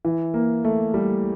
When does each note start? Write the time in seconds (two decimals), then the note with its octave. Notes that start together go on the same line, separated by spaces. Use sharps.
0.05 E3
0.34 A#3
0.64 A3
0.94 G3